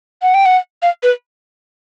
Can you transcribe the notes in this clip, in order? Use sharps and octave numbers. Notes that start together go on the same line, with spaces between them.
F#5
G5
F#5
F5
B4